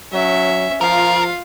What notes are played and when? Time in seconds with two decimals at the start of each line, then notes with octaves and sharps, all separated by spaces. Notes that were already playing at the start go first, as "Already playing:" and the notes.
0.13 F#3 C#4 E5
0.81 F3 F4 A#4 F5